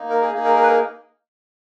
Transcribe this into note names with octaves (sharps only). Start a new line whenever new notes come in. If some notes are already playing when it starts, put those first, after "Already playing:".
Already playing: A#3 D#4
A#4
G#4
A#3 D#4 G#4
A#4
A#4
B4
A#4